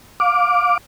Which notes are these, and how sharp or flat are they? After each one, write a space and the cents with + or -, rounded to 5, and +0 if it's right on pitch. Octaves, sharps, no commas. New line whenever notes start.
F5 +25 D6 +0